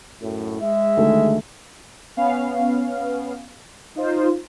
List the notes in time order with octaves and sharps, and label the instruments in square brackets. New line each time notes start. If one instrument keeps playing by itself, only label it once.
[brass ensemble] F#2 A2
G#3 E5
[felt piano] D2 D#3 A3
[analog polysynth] B3 C#4 F5
D#4 F4 C5